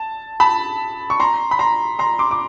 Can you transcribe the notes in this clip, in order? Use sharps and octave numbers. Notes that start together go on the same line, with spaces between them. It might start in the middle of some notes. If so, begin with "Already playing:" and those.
Already playing: A5
A5 B5
C#6
A#5 C6
B5
A#5 C6
A#5 C6
C6 D6
D6